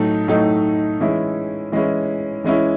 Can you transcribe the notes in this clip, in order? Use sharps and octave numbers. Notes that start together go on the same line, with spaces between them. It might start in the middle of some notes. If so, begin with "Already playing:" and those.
Already playing: A2 F#3 A3 D#4
A2 F#3 A3 D#4
E3 G#3 C#4 E4
E3 G#3 C#4 E4
E3 G#3 C#4 E4